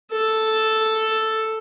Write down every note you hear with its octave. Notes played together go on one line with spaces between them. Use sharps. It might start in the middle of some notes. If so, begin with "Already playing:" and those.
A4